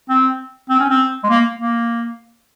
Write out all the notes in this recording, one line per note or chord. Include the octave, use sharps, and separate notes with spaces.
C4
C4
C#4
C4
G#3
A#3
A#3